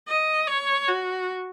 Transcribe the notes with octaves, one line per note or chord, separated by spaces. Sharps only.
D#5
C#5
F#4